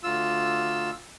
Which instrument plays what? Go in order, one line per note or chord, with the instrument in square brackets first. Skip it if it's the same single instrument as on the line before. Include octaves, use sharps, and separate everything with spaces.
[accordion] D2 F4 E6